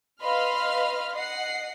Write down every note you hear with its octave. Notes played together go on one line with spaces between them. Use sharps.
B4 D#5 F5 B5 C6 F6
D#5 F#5 C7